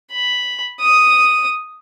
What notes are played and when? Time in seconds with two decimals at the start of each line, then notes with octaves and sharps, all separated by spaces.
0.12 B5
0.80 D#6